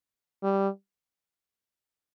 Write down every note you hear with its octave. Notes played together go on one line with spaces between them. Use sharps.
G3